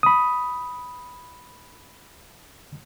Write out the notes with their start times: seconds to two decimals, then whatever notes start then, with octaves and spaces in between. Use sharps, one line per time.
0.03 B5 D#6